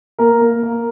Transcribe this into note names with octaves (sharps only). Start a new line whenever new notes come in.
A#3 A#4
A#3
A#3